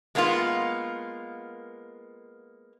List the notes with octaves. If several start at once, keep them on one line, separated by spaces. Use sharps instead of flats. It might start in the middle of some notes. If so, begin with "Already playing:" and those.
G#3 A#3 B3 D4 F4